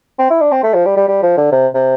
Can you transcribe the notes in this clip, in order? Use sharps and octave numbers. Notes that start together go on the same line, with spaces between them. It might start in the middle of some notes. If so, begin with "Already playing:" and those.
C4
E4
D4
C4
A3
F3
G3
G3
G3
F3
D3
C3
C3